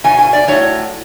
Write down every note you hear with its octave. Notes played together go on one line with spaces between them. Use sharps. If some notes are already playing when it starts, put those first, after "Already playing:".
B2 F#3 G#5
G#5
D5
A2 F#3 C#5